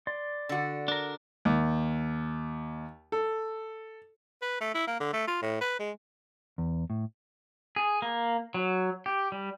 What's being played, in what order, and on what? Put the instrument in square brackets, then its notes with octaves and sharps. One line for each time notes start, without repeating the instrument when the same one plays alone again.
[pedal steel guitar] D5 C6
[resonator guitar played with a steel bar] D3 F#4
[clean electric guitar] D4 A#4
[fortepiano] D#2
A4
[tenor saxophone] B4
A3
E4
A#3
D3
A3
F4
A2
B4
G#3
[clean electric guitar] E2
A2
[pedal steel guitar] G#4
A#3
F#3
G4
G3